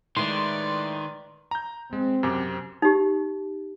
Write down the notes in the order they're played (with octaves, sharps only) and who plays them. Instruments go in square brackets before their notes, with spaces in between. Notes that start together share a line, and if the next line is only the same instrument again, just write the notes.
[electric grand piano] A2 G#3 [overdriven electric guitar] D#3 [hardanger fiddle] B4 D5 [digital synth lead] C6
[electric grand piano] A#5 G6
[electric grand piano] G#3 [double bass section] C4
[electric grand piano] F#2 C3 D6
[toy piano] D#4 G4